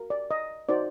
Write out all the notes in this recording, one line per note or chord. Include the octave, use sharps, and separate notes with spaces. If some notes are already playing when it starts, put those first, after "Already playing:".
Already playing: F#4 A#4
D5
D#5
D#4 F#4 C5 D5